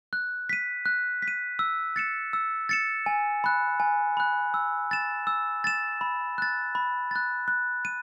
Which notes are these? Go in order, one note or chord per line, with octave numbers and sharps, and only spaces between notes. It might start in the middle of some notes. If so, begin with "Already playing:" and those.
F#6
B6 D#7
F#6
B6
D#7
E6
A6 C#7 E7
E6
A6 C#7 E7
G#5
B5 F#6
G#5
B5 F#6
E6
A6 E7
E6
A6 E7
B5
F#6 A6
B5
F#6 A6
F#6
D#7